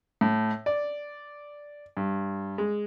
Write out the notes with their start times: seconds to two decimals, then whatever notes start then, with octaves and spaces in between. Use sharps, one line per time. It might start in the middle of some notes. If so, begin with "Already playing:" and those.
0.21 A2
0.66 D5
1.97 G2
2.58 G#3